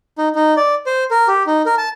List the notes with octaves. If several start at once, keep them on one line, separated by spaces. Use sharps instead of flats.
D#4
D#4
D5
C5
A#4
G4
D#4
A#4
A5